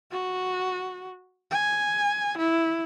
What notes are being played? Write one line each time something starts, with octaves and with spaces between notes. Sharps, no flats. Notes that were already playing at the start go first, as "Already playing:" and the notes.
F#4
G#5
E4